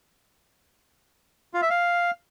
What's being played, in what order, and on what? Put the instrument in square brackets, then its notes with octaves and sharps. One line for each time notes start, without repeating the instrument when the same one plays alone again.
[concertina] F4
E5
F5